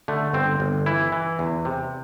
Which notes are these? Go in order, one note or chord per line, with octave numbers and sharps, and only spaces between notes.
D3 A3
G1 C4
G1
E3 E4
E3
E2
C3